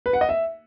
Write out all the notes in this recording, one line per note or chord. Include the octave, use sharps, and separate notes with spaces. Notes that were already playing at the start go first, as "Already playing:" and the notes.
B4
F#5
D#5
E5